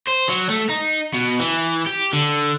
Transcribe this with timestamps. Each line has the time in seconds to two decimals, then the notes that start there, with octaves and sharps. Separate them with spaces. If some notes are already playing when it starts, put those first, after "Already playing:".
0.08 C5
0.29 F#3
0.50 A3
0.69 D#4
1.14 B2
1.40 E3
1.86 G4
2.13 D3